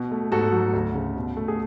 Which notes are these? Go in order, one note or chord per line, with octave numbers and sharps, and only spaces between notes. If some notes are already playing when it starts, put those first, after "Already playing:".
Already playing: B2
A3
G#2 F#4 A4
F#3
D2
C#3
B2
A3
G#4